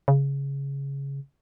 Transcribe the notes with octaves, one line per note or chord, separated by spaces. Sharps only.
C#3